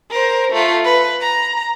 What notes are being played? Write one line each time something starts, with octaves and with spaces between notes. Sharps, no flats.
A#4 C5
A3 F4
B4
A#5